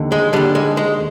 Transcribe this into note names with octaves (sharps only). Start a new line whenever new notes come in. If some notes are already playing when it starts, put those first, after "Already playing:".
Already playing: D#2 D3
G#3
D#2 D3 G3
G#3
G#3